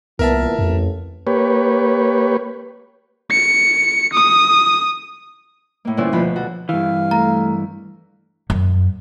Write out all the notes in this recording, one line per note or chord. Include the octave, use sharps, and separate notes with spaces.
C2 A#2 E3 B3 A#4 E5 A5
A1 F2
A#3 G4 B4 C#5
C#7
D#6
A2 A#3
G2 A#2 D3 C#4 E4 C5
D2 B2 F3 B5
F#4 A4
G2 E3 F5
A3 A#5
F#2